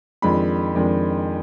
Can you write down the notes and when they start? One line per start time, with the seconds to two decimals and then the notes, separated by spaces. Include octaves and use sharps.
0.22 F2 D#3 G#3 D4 B5
0.75 F2 D#3 G#3 D4